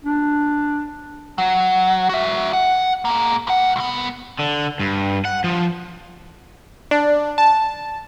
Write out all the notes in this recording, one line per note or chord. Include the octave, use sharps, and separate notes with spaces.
D4
F#3
F#4 E5
F#5
G#2 A#3
G2 F#5
C2 B3
D3
G2
F#5
F3
D4
A5